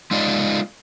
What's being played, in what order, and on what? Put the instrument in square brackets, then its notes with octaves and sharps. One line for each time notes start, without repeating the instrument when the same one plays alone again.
[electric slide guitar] G#3 D#4 F4 D5 D#5